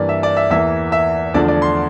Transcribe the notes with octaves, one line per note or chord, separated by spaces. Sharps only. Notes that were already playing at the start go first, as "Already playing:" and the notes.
Already playing: G2 E3 A#3 D5
E5
D5
E5
E2 E3 A#3 E5
E5
E2 D3 F3 A3 D4 D5
D5
C6